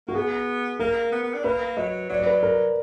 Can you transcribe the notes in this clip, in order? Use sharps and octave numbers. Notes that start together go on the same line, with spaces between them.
A#3 F#4
B3 G#4
A#3 A#4
B3
B3
D4
A#3 B4
F#3 D#5
F#3 D5
D5
B4
A#4